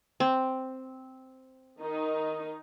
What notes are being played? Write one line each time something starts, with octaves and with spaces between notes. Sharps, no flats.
C4
D#3 D#4